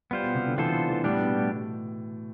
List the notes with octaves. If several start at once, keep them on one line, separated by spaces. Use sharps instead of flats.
G3 B3 F4 C5
B2
C3
D3
E3 B3 F4 A4 C5
E3
A2 G3 B3 D4 G4
B2
A2